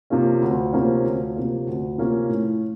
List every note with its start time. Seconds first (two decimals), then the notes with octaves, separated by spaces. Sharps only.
0.10 C3 F3 A#3 C#4
0.41 D2
0.73 C3 F3 A#3 C#4
1.04 D2
1.36 C3 F3 A#3 C#4
1.67 D2
1.98 C3 F3 A#3 C#4
2.29 A2